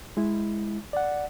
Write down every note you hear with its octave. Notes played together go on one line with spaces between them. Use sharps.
G#3 E4
D5 F#5